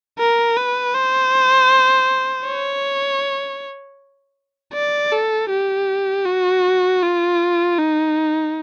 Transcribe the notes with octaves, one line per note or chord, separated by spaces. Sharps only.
A#4
B4
C5
C#5
D5
A4
G4
F#4
F4
D#4